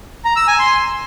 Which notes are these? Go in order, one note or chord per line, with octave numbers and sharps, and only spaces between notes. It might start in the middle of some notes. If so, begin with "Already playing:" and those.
A#5
E6
G#5
C6